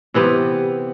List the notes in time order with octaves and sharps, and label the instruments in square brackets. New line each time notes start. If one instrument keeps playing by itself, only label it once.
[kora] C3 E3 B3 G4